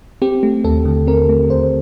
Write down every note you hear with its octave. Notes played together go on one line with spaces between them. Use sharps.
C4 G4
A3
D#2 A4
D3
C4 A#4
A3
D#2 C5